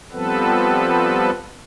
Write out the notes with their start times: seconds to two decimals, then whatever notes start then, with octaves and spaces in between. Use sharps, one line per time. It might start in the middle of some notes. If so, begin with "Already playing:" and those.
0.12 F3 G3 B3 C4 A4 B4